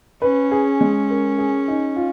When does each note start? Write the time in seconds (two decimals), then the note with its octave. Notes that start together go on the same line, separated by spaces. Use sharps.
0.22 C#4 B4
0.51 G#4
0.81 G#3
1.10 A#4
1.38 G#4
1.68 D#4
1.96 F4